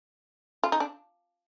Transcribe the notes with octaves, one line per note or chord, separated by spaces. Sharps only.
F4
D#4
D4